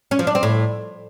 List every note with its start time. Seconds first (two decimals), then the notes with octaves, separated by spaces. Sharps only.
0.11 C#4
0.19 F3
0.27 D4
0.35 C4
0.43 A2